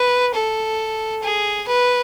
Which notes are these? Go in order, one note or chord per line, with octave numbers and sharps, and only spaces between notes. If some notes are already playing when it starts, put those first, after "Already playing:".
Already playing: B4
A4
G#4
B4